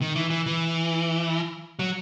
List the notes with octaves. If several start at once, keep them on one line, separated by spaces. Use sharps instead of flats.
D#3
E3
E3
E3
F#3